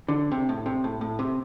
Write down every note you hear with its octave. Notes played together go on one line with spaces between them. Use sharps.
D3
C3
A2
C3
A2
A2
C3